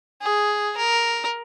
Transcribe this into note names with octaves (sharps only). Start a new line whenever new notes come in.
G#4
A#4